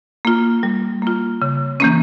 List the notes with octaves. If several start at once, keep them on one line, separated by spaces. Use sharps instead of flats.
A#3 F4
G3
A#3 F4
C#3
E3 A#3 C#4